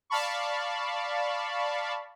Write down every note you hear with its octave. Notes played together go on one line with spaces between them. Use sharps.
D5 F5 A5 B5 C#6